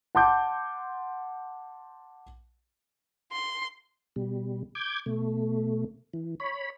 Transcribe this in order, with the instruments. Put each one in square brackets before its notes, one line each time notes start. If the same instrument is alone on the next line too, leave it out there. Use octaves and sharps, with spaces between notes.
[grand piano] F#5 A5 C6 D6 G6
[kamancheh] C6
[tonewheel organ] B2 G3
D6 G6 G#6
B2 A3
E3
C#5 B5